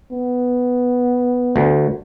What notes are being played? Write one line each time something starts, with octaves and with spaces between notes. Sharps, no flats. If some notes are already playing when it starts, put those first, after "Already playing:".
B3
D2